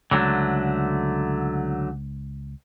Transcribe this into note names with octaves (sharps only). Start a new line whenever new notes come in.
C#2 D3 F#3 A3